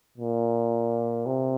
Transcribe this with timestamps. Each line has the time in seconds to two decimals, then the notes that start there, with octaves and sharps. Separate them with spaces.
0.18 A#2
1.26 C3